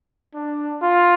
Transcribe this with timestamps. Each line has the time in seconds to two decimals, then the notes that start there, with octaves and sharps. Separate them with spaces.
0.34 D4
0.82 F4